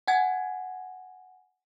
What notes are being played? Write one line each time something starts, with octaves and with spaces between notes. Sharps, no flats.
F#5 G#5 G#6